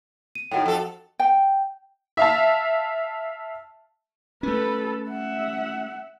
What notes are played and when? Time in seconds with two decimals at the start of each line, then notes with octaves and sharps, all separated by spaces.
0.35 D#7
0.51 A2 D#3 F#4 F#5 G5
0.66 F2 A4
1.19 G5
2.17 E5 F5 A5
4.43 A3 C#4 A4 B4
5.09 E5 F#5